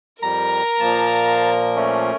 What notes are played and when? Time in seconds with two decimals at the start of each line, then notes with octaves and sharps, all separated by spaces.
0.23 F2 G3 A#4 A#5
0.80 A#2 F3 A#3 A5
1.76 A3 C#4